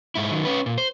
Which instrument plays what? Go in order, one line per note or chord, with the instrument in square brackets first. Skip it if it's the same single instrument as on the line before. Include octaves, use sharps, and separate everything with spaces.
[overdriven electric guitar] G#2 E4
D#3 F#3
C#4 B4
A#2
C5